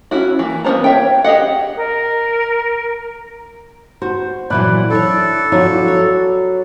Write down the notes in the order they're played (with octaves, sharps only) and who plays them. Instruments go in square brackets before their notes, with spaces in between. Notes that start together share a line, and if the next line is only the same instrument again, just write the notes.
[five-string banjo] C#4 E4 F#4
E3 A#3
A#3 B3 D4 C5 A#5
C#5 E5 G5
G4 G#4 D#5 F#5
[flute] A#4
[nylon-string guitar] F#4 [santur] C5
[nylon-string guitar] A#2 E3 F#3 [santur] D5 F#5 B5
[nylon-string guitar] D4 E4 C#5 [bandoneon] A4
[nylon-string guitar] F3 D4 E4 [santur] F#3 F#4
[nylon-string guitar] C#5